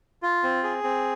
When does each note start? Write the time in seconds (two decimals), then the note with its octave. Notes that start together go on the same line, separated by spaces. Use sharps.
0.22 F4
0.43 C4
0.63 G#4
0.84 C4